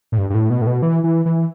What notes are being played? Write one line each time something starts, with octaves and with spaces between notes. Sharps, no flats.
A2
G2
G2
A2
B2
A2
B2
E3
E3
E3